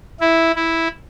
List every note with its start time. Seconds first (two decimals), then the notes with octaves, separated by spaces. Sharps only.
0.20 E4
0.55 E4